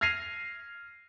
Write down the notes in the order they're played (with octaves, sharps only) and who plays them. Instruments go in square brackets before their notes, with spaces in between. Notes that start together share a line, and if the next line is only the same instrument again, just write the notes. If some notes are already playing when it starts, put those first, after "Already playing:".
[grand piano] F6 G#6 A#6 C7 D#7 F7